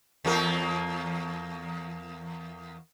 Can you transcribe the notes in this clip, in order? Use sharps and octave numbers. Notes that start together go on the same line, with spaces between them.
E2 A#3 A#4